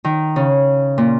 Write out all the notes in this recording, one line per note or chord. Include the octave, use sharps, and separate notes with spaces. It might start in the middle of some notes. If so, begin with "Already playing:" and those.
D#3
C#3
A#2